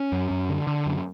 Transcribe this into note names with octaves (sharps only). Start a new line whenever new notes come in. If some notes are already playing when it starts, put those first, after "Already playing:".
Already playing: C#4
F#2
F#2
D3
D3
F#2